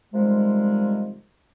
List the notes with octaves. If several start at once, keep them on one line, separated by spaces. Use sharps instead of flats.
C3 D#3 F3 G3 G#3